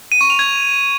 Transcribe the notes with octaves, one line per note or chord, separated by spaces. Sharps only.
D#7
C#6
F7
G#6